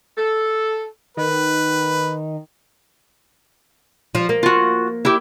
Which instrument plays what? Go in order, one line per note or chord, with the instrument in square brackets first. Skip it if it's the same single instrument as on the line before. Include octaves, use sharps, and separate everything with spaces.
[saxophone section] A4
[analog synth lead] D#3 [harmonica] B4
[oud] F3 F4
A#3
[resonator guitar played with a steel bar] F4 F#4
E4 G4